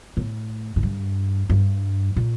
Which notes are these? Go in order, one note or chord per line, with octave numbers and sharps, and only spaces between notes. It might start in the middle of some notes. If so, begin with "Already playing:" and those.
A2
A2
G2
G2
A#2